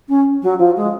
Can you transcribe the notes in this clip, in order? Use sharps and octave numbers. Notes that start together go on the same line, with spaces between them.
C#4
F#3
F3
G#3